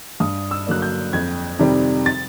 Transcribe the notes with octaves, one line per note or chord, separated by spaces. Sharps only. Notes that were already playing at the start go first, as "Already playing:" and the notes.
G2 D#6
E6
D3 F#3 A#3 D4 F#6
G6
F2 G#6
C3 D#3 G3 C4
A6